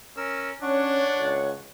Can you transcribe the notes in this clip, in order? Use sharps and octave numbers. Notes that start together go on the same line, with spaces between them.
C#4 A#4 E6
C#4 D4 C#5 F#5 C#6
C#2